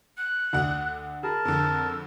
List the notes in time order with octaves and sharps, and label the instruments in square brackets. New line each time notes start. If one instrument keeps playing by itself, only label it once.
[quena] F#6
[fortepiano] D2 [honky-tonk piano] D3 F#5
[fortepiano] G#4 [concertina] A#4 A5 [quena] B5
[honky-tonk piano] F2 D3 [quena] E6